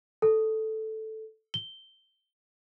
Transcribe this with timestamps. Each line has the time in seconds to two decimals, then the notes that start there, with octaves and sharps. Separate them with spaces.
0.22 A4
1.54 G7